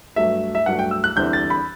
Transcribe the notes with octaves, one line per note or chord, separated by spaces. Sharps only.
G2 F#3 A3 E5
E5
G2 F#3 A3 F#5
G5
E6
F#6
E2 D3 G3 C4 E4 G6
A6
B5